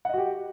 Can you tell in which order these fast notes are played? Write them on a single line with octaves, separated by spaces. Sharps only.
F#5 D#5 F#4 G4